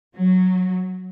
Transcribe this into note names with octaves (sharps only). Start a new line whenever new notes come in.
F#3